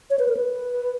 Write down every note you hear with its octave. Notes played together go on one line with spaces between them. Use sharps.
C#5
B4
A#4
B4